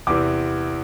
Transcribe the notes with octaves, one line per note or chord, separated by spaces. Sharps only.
E2 C3 E3 D6